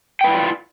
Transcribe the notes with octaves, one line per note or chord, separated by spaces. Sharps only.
E4 F4 B4 D5 G5